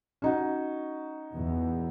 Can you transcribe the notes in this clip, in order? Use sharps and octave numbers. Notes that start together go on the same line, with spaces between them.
C#4 D#4 F#4
E2